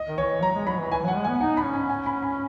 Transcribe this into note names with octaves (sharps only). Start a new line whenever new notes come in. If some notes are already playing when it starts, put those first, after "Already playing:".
Already playing: D#5
D#3
E3 C#5
F#3 A#5
G#3
F#3 B5
E3
E3 G#5
F#3 F#5
G#3
B3 G#5
D#4 F#5
B5
C#4
G#5
G#5
B5
B5